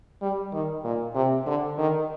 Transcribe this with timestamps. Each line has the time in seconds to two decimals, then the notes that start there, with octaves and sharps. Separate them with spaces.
0.22 G3
0.53 D#3
0.84 A#2
1.15 C3
1.47 D3
1.78 D#3